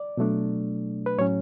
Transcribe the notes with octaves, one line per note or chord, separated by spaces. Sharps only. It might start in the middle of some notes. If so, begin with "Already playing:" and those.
Already playing: D5
B2 F#3 A3 D4
B4
A2 F#3 C#4 C#5